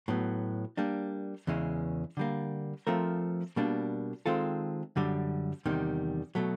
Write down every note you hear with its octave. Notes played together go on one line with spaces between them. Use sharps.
A2 F#3 B3
G3 A#3 D4
E2 C#3 E3 G#3 C#4
D3 G3 A#3
F3 A3 C4 F4 A#4
B2 G3 A#3 D4
D#3 G#3 C4 F4 A4
F#2 D3 G3
E2 C3 D#3 G3
B2 F#3 A3